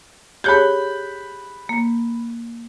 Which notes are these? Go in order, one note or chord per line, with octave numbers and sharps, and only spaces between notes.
G4 G#4 C#5 B5 F#6 G6
A#3